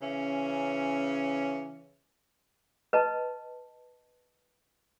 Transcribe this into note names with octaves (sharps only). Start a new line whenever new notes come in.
C#3 E3 C#4
B4 D#5 A5